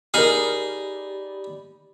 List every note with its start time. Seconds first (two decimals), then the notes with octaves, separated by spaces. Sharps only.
0.14 D#4 G4 G#4 A#4 D5 B5 F6